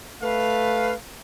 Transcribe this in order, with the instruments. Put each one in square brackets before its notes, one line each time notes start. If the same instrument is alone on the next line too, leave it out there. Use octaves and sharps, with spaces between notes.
[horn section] A3 F5 [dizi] B4